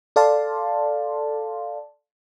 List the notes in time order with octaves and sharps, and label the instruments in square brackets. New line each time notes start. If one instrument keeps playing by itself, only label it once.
[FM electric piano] A4 D5 F5 A5 C6